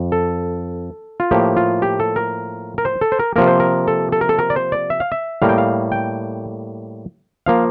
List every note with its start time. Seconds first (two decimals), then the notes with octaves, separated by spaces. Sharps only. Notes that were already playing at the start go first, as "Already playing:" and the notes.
Already playing: F2
0.12 A4
1.20 F4
1.31 A2 F3 A#3 G4
1.57 F4
1.82 G4
2.00 A4
2.16 A#4
2.78 A#4
2.85 C5
3.01 A4
3.12 C5
3.19 A#4
3.36 C3 F3 A#3 A#4
3.47 C5
3.60 A#4
3.88 A4
4.12 A4
4.21 A#4
4.29 A4
4.39 A#4
4.50 D5
4.56 C5
4.72 D5
4.90 E5
5.00 F5
5.12 E5
5.42 A2 G3 A#3 F5
5.49 G5
5.58 F5
5.92 G5
7.46 F3 A#3 F5